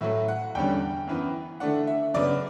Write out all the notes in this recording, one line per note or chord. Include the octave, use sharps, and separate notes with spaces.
A2 F#3 A3 E5
F#5
E2 D3 G3 C#4 G5
F#2 E3 B3
D3 A3 D4 F#5
E5
F#2 C#3 F#3 B3 D5